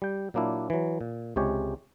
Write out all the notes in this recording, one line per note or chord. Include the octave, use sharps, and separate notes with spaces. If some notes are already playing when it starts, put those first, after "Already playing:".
G3 G5
A#2 F#3 A#3 D4 E4
E3 F#3
A#2
C#2 C3 G#3 G4 C#5